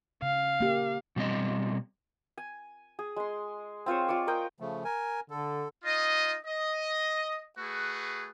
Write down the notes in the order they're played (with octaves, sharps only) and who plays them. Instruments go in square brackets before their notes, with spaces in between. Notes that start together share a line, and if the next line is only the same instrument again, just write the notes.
[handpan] C#3 [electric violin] F5
[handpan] A#3 G4
[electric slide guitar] B2 G3 C4 D#5
[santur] G#5
G#4
G#3 C6
C4 F4 C5 C#5
F4 D5 C#6 D6
A#4 D#5 G5
[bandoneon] C#3 F3 A3
A#4 G#5
[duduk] D3 [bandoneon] A4
[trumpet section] D#4 F4 D#5
D#5
A3 F#4 G#4 B4